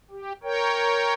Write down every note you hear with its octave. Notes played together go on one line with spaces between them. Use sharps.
G4
A#4 C#5 G5